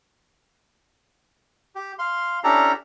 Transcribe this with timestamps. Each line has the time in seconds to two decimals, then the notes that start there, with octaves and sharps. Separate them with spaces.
1.75 G4
1.99 F5 C6
2.44 C#4 D4 E4 G4 A4 A#5